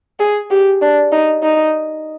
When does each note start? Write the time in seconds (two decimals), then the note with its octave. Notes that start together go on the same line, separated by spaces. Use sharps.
0.19 G#4
0.51 G4
0.81 D4
1.12 D#4
1.43 D#4